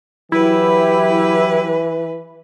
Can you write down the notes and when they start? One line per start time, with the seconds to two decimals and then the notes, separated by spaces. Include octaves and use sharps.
0.32 E3 F#3 E4 G4 B4